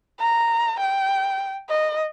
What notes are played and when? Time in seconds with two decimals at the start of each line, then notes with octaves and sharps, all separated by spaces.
0.20 A#5
0.80 G5
1.69 D#5